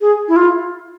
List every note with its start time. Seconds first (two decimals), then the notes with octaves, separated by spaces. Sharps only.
0.01 G#4
0.28 E4
0.36 F4